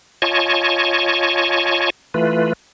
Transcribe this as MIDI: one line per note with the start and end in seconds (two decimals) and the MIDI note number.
0.22 1.90 65
0.22 1.90 73
0.22 1.90 75
0.22 1.90 80
0.22 1.90 81
0.22 1.90 85
2.14 2.53 52
2.14 2.53 57
2.14 2.53 65
2.14 2.53 71